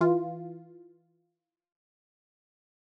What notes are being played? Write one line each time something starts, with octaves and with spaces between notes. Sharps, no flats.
E3 F4